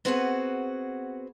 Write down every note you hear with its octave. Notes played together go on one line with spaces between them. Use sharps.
B3 C4 F#4 G#4 B4 F#5